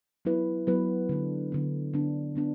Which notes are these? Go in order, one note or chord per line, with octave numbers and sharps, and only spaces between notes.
F#3 B3 E4 B4
F#3 B3 E4 B4
D3 B3 D4
D3 B3 D4
D3 B3 D4
D3 B3 D4